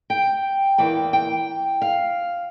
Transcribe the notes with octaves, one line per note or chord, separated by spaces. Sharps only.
G5
E2 E3 A#3 G5
G5
F5